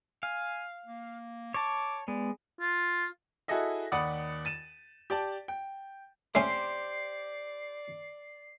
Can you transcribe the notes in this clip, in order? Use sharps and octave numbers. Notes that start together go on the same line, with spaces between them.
F5 G#5
A#3
C#5 A5 D6
G#3 B3 D5
F4
E4 F#4 G#4 A4 D#5 E5
D#2 D5 F#5 B5 D#6
A6 D#7 E7
G4 D5 A5
G5
A3 C#4 G4 C5 D5 C7